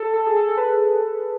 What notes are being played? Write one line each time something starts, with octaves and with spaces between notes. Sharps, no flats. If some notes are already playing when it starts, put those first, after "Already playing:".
Already playing: A4
A4
G#4
A4
A4
B4